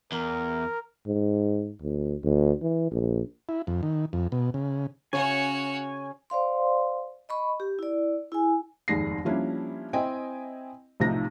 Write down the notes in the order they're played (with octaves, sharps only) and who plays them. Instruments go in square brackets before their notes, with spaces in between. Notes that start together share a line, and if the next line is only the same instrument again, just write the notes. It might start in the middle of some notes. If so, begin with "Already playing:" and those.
[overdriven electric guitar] E2 [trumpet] A#4
[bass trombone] G#2
D2
D2
E3
A#1
[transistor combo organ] E4
F2
D#3
F2
B2
C#3
[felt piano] C#3 [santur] C#4 [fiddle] F#4 C#5 [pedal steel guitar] G#5
[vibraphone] C5 D5 F5 C6
D#5 B5 C#6
G4
E4 D5
E4 G#4 G#5
[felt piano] F1 D#2 G#2 G#4 A#6 C7
F3 G3 A#3 C#4 D4 E4
C4 E4 D#5 G5 G#5
B1 A2 C3 F3 D#4 A#6